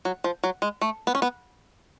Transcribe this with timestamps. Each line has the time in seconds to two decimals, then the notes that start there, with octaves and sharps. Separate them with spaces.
0.05 F#3
0.24 F3
0.43 F#3
0.62 G#3
0.81 A3
1.07 B3
1.15 C#4
1.22 B3